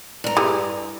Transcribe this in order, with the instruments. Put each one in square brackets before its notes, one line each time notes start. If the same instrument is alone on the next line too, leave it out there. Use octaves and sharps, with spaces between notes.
[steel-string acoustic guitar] G2 A#5
[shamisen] G3 E4 G#4